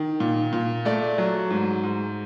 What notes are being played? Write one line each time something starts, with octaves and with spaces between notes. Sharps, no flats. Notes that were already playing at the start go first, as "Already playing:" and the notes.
Already playing: D#3
A#2
A#2
A3 D5
F#3
G#2
G#2